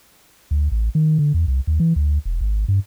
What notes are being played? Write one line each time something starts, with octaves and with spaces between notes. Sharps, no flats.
D2
A1
D#3
D3
E2
C2
D#2
E3
D2
E1
G#1
G2